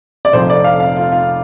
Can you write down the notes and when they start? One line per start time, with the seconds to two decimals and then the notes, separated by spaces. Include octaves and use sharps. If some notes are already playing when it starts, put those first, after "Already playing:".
0.25 D5
0.33 F1 F2 F3 C5
0.50 D5
0.64 F5
0.80 F5
0.97 F4
1.12 F4